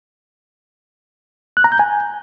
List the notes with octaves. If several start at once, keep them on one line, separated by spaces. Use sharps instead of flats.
F#6
A#5
G6
G#5